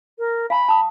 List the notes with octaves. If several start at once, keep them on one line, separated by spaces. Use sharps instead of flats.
A#4
F5 G#5 A#5 B5
A5 D#6